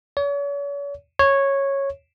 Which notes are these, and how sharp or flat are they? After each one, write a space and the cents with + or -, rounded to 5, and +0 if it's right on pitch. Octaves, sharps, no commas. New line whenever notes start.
C#5 +40
C#5 -10